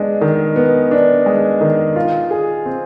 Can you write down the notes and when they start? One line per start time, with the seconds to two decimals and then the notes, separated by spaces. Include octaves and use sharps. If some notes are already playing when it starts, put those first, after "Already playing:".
Already playing: G#3 B3 D4
0.21 D#3
0.56 B3
0.91 D4
1.26 G#3
1.61 D#3
1.96 F4
2.31 G#4
2.66 C4